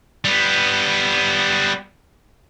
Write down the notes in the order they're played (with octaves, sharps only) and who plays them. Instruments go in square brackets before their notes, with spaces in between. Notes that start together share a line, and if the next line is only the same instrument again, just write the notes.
[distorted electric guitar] G3 B3